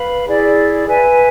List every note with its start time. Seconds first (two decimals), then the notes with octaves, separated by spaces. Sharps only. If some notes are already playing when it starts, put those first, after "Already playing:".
Already playing: B4 F5 B5
0.27 E4 G#4 D5
0.87 B4 E5 G#5